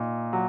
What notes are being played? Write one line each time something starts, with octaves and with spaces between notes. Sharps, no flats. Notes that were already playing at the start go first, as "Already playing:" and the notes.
Already playing: A#2 D#4
F#3